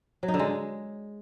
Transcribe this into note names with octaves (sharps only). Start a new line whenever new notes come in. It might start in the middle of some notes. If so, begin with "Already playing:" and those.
F#3
D#4
D3
G#3